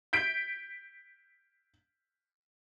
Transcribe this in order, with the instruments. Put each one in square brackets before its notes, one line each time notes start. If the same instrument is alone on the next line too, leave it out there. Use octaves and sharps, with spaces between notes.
[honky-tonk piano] G6 B6 D7